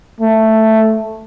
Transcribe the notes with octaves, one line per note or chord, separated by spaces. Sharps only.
A3